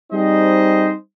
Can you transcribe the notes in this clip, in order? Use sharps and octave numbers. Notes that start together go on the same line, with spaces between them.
G3 C4 D#4 G#4 C5 D#5